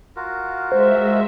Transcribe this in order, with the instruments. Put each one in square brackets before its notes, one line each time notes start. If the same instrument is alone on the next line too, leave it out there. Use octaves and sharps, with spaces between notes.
[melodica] F4 F#4 A#4
[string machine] G#3 E5 [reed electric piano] C5